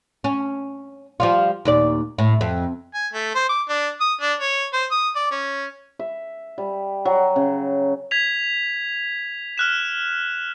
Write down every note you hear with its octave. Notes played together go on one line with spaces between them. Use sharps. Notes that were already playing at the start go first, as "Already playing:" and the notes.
C#4
F3 G3 F4
D#2 A#2 D5
A2
F2
G#5
A3
C5
D6
D4
D#6
D4
C#5
C5
D#6
D5
C#4
E5
G3
F#3
C#3
G#6 B6 F7
F6 F#6 E7